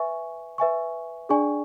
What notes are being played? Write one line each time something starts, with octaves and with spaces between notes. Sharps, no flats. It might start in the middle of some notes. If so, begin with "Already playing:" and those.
Already playing: B4 E5 G#5 C#6
B4 E5 G#5 C#6
D4 G#4 D5 G#5 C#6